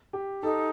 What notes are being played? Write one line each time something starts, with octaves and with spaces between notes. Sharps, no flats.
G4
D#4 A4